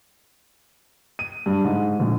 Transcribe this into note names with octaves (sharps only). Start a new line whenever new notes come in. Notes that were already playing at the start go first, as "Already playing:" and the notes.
D#7
G2
G#2
A#1